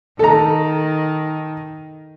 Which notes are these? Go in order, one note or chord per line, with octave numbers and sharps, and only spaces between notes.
D#3 A4 A#5